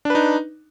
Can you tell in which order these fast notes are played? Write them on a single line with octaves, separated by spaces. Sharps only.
D4 B4 D#4